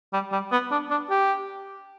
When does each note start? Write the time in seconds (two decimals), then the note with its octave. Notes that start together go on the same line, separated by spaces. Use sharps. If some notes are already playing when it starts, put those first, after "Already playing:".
0.13 G3
0.32 G3
0.52 B3
0.71 D4
0.90 D4
1.10 G4